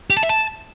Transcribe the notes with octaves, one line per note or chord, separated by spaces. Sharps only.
G4
A5
E5
A5